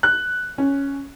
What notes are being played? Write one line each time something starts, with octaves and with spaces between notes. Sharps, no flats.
F#6
C#4